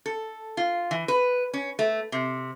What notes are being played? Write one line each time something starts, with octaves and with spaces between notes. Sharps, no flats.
A4
F4
E3
B4
C#4
A3
C3